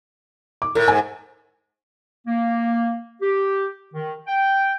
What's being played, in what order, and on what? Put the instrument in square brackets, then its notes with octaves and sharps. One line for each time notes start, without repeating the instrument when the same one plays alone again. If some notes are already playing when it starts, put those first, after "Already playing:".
[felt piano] D6
[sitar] A2 [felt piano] A#4
[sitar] G#2 [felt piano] G#5
[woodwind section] A#3
G4
D#3
G5